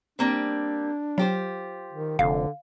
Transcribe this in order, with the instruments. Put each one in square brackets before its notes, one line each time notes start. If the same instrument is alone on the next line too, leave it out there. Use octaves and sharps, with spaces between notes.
[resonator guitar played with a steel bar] G3 A#3 C4 [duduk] D4
[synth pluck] F#3 [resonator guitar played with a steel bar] F4 G4 C5
[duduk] D#3
[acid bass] F1 [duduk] D3 [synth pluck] F5